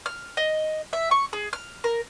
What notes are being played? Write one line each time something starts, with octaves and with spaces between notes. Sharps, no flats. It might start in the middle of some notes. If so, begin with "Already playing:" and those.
F6
D#5
E5
C#6
G#4
F6
A#4